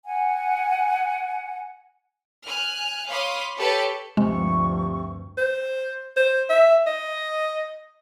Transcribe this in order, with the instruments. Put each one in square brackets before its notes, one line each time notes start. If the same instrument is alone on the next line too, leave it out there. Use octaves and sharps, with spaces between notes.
[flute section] F#5 G#5
[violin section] G#5 F6 F#6
C#5 F5 B5 C6 D6 D#6
G4 A4 B4 C#5 A5
[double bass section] D2 G2 F3 [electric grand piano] C3 [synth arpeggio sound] G#3 [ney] C#6
[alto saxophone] C5
C5
E5
D#5